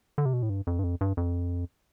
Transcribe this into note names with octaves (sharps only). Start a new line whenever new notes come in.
D3
C3
B2
A2
G2
F2
G2
F2
G2
F2